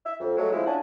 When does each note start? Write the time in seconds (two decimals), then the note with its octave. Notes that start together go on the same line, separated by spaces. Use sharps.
0.06 E5
0.20 F2
0.37 F#3 G#3 A3
0.53 F3 G#3 C4 E4
0.66 C#4 D4 F4 F#5 G#5 A5